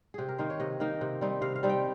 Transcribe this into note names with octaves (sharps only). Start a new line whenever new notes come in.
C3 G4 G#4
A#4
D#3 A#3 D#4 C5
C#5
C3 D#5
D#3 A#3 D#4
C3
G3 C4 D#4
C3 F5
F5
G3 C4 D#4
G5